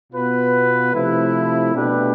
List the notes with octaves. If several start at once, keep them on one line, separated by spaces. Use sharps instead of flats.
B2 B3 F4 B4
C3 F3 A3 E4
B2 A3 D4 G4 B4